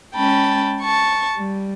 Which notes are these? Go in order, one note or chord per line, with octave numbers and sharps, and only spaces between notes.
G#3 C#4 G5 A5 B5
A5 C#6
G3